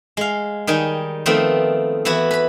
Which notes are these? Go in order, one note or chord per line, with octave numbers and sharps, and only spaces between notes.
G#3 F5
D#3 G3 D#4 G#5
D#3 F3 A3 B3 C4
E3 B3 E4 F#4 B4
B4 B5